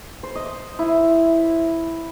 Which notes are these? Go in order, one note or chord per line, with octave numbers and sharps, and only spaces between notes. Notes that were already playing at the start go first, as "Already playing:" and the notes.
C5
D#5
E4